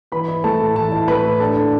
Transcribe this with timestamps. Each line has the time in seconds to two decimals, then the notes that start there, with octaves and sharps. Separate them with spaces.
0.12 E3 B4 B5
0.28 E4
0.44 A3 A4 A5
0.60 A2
0.76 E3 A4 A5
0.92 E4
1.08 A3 B4 B5
1.24 A2
1.40 D4 A4 A5
1.57 D4